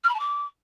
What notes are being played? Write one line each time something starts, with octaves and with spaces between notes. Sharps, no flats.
F6
B5
A5
D6